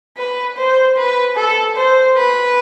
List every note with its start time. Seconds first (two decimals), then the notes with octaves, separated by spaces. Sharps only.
0.17 B4
0.57 C5
0.97 B4
1.36 A4
1.75 C5
2.16 B4